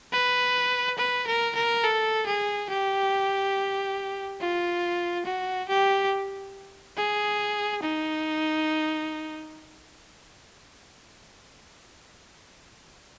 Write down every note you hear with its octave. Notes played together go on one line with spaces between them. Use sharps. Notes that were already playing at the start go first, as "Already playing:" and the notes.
B4
B4
A#4
A#4
A4
G#4
G4
F4
F#4
G4
G#4
D#4